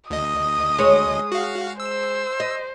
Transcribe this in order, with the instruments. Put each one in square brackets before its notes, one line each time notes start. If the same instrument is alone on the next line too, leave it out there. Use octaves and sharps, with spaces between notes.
[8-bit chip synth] D2 D#5 [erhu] D#6
[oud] G#3 C#5
[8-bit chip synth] F#4 F5
[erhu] C5 [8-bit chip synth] E6
[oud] D#5